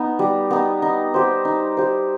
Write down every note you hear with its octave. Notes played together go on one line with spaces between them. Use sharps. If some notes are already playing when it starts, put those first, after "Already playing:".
Already playing: B3 D#4
G3
B3 D#4
D#4
G4 C5
D#4
G4 C5